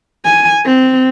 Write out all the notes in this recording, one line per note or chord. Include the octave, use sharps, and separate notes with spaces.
G#5
C4